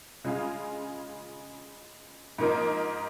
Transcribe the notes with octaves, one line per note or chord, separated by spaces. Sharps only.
C#3 G#3 F4 G#4 F5
G#2 F3 A#3 D#4 A#4